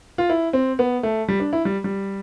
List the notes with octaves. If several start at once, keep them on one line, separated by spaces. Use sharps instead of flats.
F4
E4
C4
B3
A3
G3
D4
E4
G3
G3